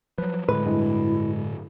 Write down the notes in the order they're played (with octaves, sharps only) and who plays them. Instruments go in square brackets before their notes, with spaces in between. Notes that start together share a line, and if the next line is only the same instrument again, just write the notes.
[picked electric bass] F3 F#3 [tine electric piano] B4
[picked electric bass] A2 D3 [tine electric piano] G#3 [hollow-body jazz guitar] B4
[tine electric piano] G2 G#3 [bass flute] E4